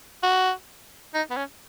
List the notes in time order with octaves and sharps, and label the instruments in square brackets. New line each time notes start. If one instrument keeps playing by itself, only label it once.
[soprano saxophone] F#4
D#4
B3
C#4